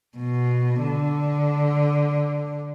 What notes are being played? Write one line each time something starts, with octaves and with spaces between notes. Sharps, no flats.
B2
D3